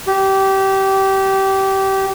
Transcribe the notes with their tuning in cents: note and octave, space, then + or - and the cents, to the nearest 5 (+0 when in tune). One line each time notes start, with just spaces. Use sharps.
G4 -20